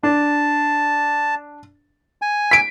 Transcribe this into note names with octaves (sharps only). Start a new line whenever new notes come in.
D4 A5
G#5
B6 D7